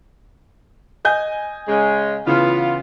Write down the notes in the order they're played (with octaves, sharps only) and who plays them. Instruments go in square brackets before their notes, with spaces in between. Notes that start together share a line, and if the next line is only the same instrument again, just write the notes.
[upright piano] D#5 G#5 G6
[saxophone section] C#3 G#3
[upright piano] C#3 E3 [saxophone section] B3 F4